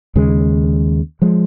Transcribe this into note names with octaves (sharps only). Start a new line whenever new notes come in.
D#2 C#3 G#3
F3 G#3